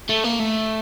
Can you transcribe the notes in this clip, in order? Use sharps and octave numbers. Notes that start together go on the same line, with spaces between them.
A3
A#3
A3